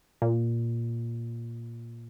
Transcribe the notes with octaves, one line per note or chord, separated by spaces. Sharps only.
A#2